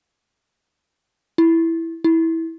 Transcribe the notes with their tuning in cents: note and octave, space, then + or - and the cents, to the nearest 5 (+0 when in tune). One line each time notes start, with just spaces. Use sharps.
E4 +0
E4 -15